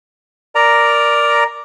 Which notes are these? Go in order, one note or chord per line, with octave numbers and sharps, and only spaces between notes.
A#4 D5 A#5